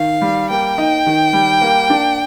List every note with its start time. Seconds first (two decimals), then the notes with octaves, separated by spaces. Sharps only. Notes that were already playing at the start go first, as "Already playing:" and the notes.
Already playing: D#3 F5
0.22 G3
0.50 A#3 G5
0.78 D#4
1.06 D#3
1.33 G3
1.61 A#3
1.90 D4